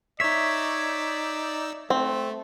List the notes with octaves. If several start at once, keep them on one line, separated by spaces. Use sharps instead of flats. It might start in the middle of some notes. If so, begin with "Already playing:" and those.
D#4 C#5 D5 E5 E6
A3 C4